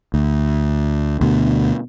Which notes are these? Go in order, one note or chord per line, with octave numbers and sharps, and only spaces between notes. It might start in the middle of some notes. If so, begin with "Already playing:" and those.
D2
D2 B2